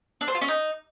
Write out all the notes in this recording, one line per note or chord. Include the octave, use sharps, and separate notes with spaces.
D4
C5
F4
C#4
D#4